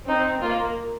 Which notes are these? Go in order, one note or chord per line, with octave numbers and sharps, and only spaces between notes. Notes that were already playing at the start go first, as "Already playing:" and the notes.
C4 D#4
A#3 F4